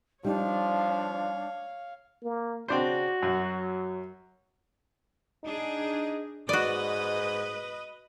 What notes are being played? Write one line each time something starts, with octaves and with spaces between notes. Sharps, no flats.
F3 G3 D4 D#4 C#5 F5
A#3
C#3 C4 D4 F#4 C5
F#2 F#3
D4 D#4 G#4
G#2 F#4 B4 D5 D#5